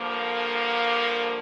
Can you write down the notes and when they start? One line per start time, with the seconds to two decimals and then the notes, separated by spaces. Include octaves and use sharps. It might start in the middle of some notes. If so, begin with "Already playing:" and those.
Already playing: G2 D3 F3 A#3